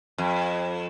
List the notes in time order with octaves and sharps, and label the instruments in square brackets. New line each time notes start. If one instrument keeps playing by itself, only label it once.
[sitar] F2